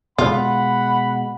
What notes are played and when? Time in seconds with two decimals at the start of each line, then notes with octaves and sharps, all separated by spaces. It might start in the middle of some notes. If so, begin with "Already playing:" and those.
0.18 B2 G#3 F4 F#5 B5